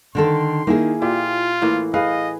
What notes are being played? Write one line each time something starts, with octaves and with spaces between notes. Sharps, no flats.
D3 D#3 A4 C6
D#3 A#3 E4 G#4
A#2 F4 G4
A2 E3 A#3
G#4 B4 D#5 F5